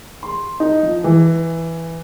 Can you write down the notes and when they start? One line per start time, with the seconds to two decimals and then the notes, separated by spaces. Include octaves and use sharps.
0.23 C6
0.60 D#4
0.83 F3
1.04 E3